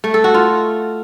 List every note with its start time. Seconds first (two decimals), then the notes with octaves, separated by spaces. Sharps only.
0.04 A3
0.14 A4
0.24 F#4
0.34 F4